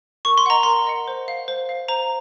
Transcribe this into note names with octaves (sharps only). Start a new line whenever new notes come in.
A#4 C#6
C6
D#5 F#5 A#5
A#4 C6
D#5 F#5
C5
F5
C5
F5
C5 A#5